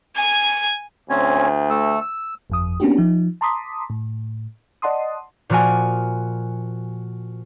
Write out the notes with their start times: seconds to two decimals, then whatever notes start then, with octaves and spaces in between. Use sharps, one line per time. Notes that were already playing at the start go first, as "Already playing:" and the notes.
0.16 G#5 G#6
1.10 D2 C4 C#4 G#5
1.70 A3 E6
2.01 E6
2.50 G1 F2 D#6
2.80 A#3 B3 C#4 D4 F#4 G4
2.97 F3 D#4
3.41 A5 A#5 C6 D6 D#6 B6
3.90 A2
4.82 D5 D#5 F#5 A5 C6 D#6
5.50 A#2 F3 F#4 A#4 F#5 G#5